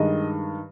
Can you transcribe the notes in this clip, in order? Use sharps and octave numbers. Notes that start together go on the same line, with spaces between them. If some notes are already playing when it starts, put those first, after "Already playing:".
Already playing: G2 D#3 G#3 D#5